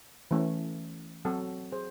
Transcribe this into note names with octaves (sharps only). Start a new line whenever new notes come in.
E3 A3 C#4
F#3 C4 F#4 A4
G#4 C5